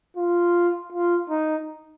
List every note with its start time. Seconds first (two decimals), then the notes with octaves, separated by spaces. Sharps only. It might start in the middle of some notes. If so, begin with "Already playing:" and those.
0.17 F4
0.92 F4
1.30 D#4